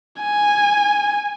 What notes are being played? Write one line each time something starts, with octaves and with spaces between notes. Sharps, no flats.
G#5